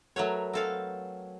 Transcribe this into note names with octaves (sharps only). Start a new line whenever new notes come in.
F#3 A3 A#4 B4 C#5 F#5
F#3 C4 A4 F5